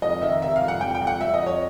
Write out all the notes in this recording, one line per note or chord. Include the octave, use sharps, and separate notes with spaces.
F2 D#5
D#3 E5
C3 E5
F5
F2
F#5
F2 G5
G5
F2
F#5
F2 E5
D#5
F2
C#5